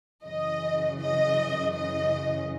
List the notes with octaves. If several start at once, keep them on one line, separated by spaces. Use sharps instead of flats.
F#2 C#3 E3 D#5
D#5
D#5